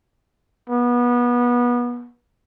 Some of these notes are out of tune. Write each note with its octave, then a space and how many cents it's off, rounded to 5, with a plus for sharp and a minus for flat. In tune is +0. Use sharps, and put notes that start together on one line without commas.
B3 -25